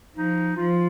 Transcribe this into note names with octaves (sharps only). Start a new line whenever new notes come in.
F3 D#4
F3 F4